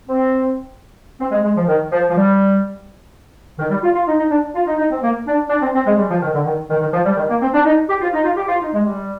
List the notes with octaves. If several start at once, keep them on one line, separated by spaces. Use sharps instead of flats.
C4
C4
G#3
G#3
F3
D#3
F3
F3
G3
D#3
G3
F4
F4
D#4
D#4
D4
F4
D#4
D#4
C4
A#3
D4
D4
C4
C4
G#3
G3
F3
D#3
D3
D#3
D#3
D#3
F3
G3
D#3
A#3
C4
D4
D#4
G4
F4
D#4
F4
G4
F4
D#4
G#3
G3